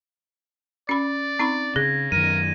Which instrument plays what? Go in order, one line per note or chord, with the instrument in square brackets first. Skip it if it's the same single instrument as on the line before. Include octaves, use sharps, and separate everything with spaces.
[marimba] C#4 B5 [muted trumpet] D5
[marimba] C4 D#4 B5
[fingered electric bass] C#3 [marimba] G#4 [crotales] G#6 A#6
[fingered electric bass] F#2 D#3 [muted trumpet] A#4 [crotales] D#7